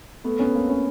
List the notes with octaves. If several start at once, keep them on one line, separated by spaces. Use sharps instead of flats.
A3 B3
B3 C#4
A#3 C4
B3 C#4